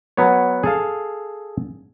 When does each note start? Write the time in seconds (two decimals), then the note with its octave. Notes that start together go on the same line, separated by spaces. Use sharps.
0.17 F#3 B3 C#5
0.63 G#4 A4 F5